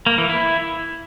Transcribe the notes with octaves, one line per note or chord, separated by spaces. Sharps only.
A#3
E3
E4